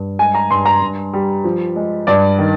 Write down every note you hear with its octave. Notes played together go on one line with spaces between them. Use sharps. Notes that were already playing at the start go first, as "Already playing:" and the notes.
Already playing: G2
G#3 G#5
A#5
G2 C6
A#5
G2
G3
F3
G#3
G2 D5
D#3